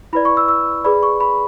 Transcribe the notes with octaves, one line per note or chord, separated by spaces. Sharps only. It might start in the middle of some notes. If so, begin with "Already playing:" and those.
E4 B4 D5 B5
C#6
E6
E6
G#4 B4 D5 B5
C#6
B5